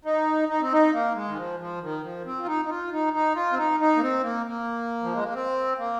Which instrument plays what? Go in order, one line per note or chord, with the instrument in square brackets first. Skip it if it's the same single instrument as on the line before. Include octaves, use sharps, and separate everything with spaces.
[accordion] D#4
D#4
C4
D#4
A#3
G#3
D#3
F3
F3
D#3
F3
C4
F4
D#4
D#4
F4
D#4
D#4
F4
C4
D#4
D#4
A#3
C4
A#3
A#3
F3
G#3
A#3
C4
A#3